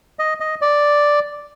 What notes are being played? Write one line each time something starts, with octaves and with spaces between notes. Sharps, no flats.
D#5
D#5
D5